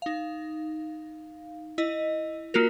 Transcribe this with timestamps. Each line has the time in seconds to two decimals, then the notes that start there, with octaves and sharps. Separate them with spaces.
0.02 D#4 F5
1.78 E4 D#5
2.54 A#3 F4 F#4 A#4